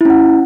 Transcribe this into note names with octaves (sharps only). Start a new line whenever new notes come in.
C#4 E4 F#5